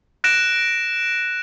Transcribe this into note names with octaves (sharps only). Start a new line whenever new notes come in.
F#6 A#6 D7 E7